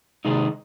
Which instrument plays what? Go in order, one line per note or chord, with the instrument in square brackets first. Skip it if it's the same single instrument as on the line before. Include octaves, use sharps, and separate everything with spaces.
[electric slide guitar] C3 D#3 G#3 D#4